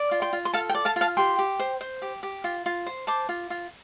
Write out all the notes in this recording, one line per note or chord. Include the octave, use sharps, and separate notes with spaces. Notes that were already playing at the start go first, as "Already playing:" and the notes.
Already playing: D5
F4
G5 C6
F4
C6
A4 F5 A5
G5
D5
F5 A5
F4
F5 A5
G4 G5 C6
G4
C5
C5
G4
G4
F4
F4
C5
C5 A5 D6
F4
F4